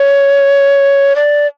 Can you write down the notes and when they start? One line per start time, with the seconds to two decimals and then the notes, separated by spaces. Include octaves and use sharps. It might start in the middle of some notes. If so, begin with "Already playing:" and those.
Already playing: C#5
1.16 D5